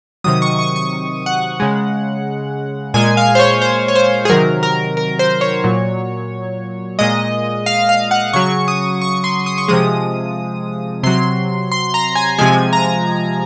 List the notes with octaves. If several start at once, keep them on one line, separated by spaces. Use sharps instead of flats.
C3 D#3 F#3 D#6
C#6
C#6
C#6
F#5
C#3 G#3
A#2 G#3 G#5
F5
C5
C#5
C5
C#5
C5
G#4
C3 D#3 F#3 A#4
A#4
A#4
C5
C#5
A#2 F#3
A#2 G#3 D#5
F5
F5
F#5
C#3 F#3 C#6
D#6
C#6
C6
D#6
C#6
C3 F3 G#3 D#6
C3 F#3 C6
C6
A#5
G#5
C3 F3 G#3 G#5
A#5